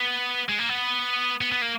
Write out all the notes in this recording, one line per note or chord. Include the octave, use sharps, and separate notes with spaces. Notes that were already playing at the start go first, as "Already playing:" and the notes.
Already playing: B3
G#3
A#3
B3
B3
B3
A#3